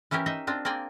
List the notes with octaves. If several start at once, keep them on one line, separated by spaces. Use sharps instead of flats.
E3 C#4 E4 G4 A#4
D#4 D#5 E5
C4 D4 F4
A#3 C4 G#4 D5 G5